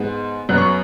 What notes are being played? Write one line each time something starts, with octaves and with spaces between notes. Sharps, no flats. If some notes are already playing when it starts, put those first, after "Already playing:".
Already playing: G#2 G#3 B3
F#2 F#3 B3 F#6
C#6